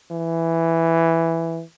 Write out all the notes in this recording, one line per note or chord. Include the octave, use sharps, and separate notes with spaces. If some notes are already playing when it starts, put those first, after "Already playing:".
E3